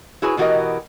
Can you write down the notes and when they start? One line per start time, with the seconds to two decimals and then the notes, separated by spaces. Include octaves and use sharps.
0.22 E4 F#4 G#4 B4 C#5
0.37 B2 E3 F#4 G4 A#4 D#5